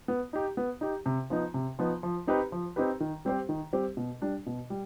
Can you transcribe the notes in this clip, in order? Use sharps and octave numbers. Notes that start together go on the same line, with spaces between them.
B3
D#4 G4
B3
D#4 G4
C3
F3 B3 D#4
C3
F3 B3 D#4
F3
C4 D#4 G4 B4
F3
C4 D#4 G4 B4
D#3
G3 C4 G4 C5
D#3
G3 C4 G4 C5
B2
G3 D4
B2
G3